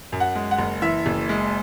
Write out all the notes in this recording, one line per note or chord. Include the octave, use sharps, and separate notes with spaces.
F#2
F#5
G#3
F#5
F#1
E3 E5
F#1
G#3